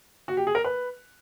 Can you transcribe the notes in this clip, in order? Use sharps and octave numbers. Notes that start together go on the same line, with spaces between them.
F#4
G4
G#4
A#4
B4